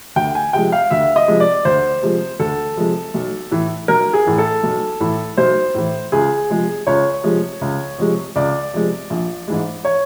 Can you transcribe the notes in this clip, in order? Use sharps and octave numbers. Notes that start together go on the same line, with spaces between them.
D2 G5
G#5
C3 F3 G#3 G5
F5
D2 E5
D#5
C3 F3 G#3
D5
D2 C5
C3 F3 G#3
D2 A4
C3 F3 G#3
B1
A2 E3
B1 A#4
G#4
A2 E3
A4
B1
A2 E3
B1 C5
A2 E3
C#2 G#4
C3 F3 G#3
C#2 C#5
C3 F3 G#3
C#2
C3 F3 G#3
C#2 D5
C3 F3 G#3
A#1
G#2 E3 G#3
C#5